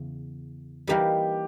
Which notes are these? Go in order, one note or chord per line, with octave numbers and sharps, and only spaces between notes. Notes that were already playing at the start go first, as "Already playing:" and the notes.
Already playing: E2 C#3
E3 G3 A#3 D#4 G4 A#4